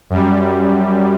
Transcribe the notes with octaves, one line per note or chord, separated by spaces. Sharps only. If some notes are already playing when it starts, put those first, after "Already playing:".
F#2 G3